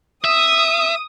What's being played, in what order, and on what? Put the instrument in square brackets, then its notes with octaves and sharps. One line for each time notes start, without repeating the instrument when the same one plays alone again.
[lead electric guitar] E5 [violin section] D#6